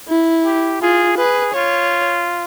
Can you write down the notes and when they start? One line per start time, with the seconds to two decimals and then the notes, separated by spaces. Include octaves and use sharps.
0.08 E4
0.45 G4
0.82 F4 G#4
1.17 G#4 B4
1.54 F4 C#5